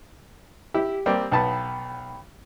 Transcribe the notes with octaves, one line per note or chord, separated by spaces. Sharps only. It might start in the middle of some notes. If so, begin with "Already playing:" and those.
E4 G4
G3 A#3 C4
B1 B3 G5 A5 B5